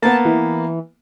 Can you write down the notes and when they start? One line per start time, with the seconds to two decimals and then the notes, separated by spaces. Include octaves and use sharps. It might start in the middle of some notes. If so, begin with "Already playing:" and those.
0.02 A#3 B3 A5
0.25 E3